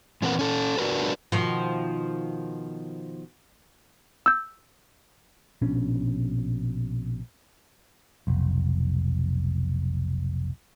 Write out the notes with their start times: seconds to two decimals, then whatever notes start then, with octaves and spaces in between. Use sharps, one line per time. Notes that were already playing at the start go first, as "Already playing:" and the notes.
0.22 A#2 E3 C4 A#4 B4 F#5
0.39 C#4 A4
0.78 D4 F#4 A#4 B4
1.32 B2 D#3 F3
4.26 E6 G6
5.62 A#1 B2 C#4 D4
8.27 F1 B1